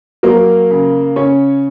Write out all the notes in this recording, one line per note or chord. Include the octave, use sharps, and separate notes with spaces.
F#3 A#3 A#4
C#3
C#3 C#4 C#5